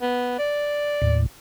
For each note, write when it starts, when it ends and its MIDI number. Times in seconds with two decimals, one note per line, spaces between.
0.02 0.34 59
0.39 1.17 74
1.02 1.26 39
1.02 1.26 45